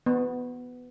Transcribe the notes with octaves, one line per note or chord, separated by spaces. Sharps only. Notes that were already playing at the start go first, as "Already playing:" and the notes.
B3